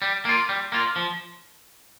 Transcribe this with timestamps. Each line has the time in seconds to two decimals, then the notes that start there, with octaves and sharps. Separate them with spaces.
0.02 G3
0.25 A#3 F4
0.49 G3
0.72 A#3 F4
0.96 F3